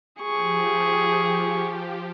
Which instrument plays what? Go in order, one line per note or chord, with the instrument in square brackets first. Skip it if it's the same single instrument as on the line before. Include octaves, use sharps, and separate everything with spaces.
[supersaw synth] F3 G4 [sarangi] G#4 [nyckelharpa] C#6